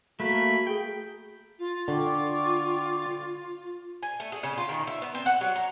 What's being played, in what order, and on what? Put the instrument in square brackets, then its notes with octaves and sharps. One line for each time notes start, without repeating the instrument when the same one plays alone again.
[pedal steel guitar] A3 A#3 [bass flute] F#4 [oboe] B5
[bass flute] G#4 [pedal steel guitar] G5
[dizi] F4
[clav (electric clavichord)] D3 [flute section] G5 C#6 D6
[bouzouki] G#5
A3
G#4
C#3
F4
D#3
E5
B3
C4
F#5
F#3
A#5